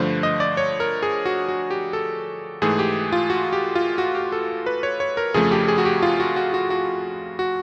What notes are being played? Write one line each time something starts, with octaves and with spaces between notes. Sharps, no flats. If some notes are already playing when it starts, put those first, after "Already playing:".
Already playing: G2 D3 F3 A3 C5
D#5
D5
C#5
A#4
G#4
F#4
F#4
G4
A4
G#2 E3 A3 G#4
G4
F4
F#4
G4
F4
F#4
G4
A4
B4
C#5
C#5
A#4
F2 C#3 F3 A3 G#4
G4
G#4
F#4
G4
F4
F#4
F#4
F#4
F#4
F#4